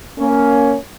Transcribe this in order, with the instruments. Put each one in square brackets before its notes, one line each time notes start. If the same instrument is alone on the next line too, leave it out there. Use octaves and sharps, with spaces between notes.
[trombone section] A#3 C#4